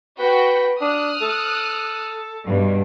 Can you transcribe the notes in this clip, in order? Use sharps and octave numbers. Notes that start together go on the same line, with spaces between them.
F#4 B4 G5
D4 D#6 F6 F#6
A4
G2 B2